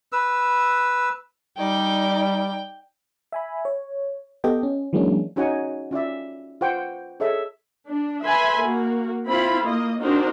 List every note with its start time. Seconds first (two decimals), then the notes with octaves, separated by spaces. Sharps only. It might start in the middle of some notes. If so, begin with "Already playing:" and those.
0.12 B4 E6
1.58 G3 D#4 D5 G5
3.32 E5 G#5 B5
3.65 C#5
4.44 B3 G4 A4 D#5 G5
4.63 C#4
4.93 E3 F#3 G#3 A#3 C#4 D4
5.36 C#4 D#4 F#4 C#5 F#5 G#5
5.91 C#4 F4 D5 E5
6.61 F4 B4 C5 F#5 G5 C#6
7.20 G#4 A4 C#5 D#5 E5
7.88 D4
8.25 B4 E5 G#5 B5 C6
8.60 A#3 F#4
9.26 C4 E4 F4 B5
9.65 A#3 D#5
10.01 C4 D4 D#4 F#4 A#4 C5